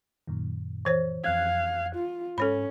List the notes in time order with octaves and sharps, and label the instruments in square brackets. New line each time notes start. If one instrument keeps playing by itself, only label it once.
[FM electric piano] F#2 A#2 D#3
[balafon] E3 C5 C#5
[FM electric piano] F2 F#6 G#6 [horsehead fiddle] F5
[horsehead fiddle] F4
[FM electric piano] G#2 [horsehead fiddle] C#4 [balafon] A4 C#5 B5